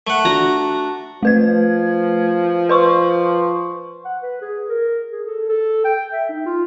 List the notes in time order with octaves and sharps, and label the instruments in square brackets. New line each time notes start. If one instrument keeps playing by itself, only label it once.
[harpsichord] A3 F#5
[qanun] D4 F#4 A#5
[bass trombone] F3 [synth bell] A3 B4 G#6
[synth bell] B4 C6 C#6
[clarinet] F#5
B4
G#4
A#4
G#4
A4
A4
G5
E5
D#4
F4